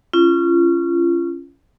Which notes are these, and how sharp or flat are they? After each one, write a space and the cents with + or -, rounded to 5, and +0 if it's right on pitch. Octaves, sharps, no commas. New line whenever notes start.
C#4 +0 F4 -30